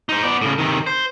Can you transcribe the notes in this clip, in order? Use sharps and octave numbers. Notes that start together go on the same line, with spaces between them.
D#4 C5
B3 D5
A2 C#3
C3 D#3
C5